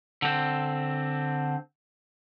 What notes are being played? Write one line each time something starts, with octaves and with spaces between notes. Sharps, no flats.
D3 C4